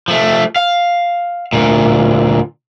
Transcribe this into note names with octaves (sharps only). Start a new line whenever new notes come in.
F3 A3
F5
D2 A#2